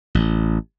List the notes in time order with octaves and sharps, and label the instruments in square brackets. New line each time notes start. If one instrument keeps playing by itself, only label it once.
[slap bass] A1